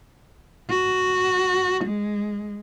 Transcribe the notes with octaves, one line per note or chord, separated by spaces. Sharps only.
F#4
G#3